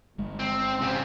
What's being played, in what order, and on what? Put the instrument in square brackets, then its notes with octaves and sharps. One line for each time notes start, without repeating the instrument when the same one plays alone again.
[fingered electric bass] G1 G#3
[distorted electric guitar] C4
C#3 C4